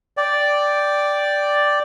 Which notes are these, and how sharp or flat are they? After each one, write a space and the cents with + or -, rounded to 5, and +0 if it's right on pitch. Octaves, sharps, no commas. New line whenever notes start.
D5 +0 G5 +0